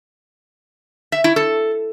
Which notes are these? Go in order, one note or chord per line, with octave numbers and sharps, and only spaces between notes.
E5
E4
A4